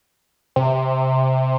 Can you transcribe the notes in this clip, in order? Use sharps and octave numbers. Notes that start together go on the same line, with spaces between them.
C3